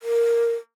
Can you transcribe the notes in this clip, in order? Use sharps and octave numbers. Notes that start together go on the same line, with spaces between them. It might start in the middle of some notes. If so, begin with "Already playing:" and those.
A#4